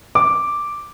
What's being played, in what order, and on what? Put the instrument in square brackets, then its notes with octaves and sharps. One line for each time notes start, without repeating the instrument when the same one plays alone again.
[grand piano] D6